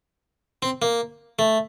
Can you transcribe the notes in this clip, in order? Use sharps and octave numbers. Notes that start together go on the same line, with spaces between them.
C4
A#3
A3